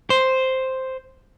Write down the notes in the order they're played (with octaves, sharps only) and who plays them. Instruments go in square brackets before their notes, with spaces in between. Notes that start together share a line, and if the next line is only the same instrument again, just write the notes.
[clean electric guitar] C5